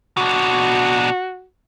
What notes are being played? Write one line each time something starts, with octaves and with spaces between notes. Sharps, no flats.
B2 D4 F#4